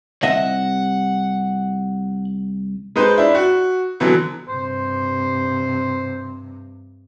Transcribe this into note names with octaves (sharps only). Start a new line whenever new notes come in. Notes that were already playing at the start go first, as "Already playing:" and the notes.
C2 D#5 E5 F#5
G#3 D#4 B4 C5
D4 E4
F#4
B2 D3 E3 F#3
G2 C3 C5